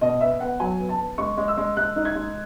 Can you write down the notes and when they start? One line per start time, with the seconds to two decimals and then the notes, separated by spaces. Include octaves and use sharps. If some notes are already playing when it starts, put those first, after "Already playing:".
0.01 B2 D#5
0.21 B3 E5
0.40 B3 F#5
0.60 F#3 G#5
0.79 B3
0.89 A5
0.99 B3
1.18 G#3 C#6
1.37 G#3
1.48 E6
1.57 G#3
1.77 G#3 F#6
1.96 D#4
2.05 G#6
2.15 G#3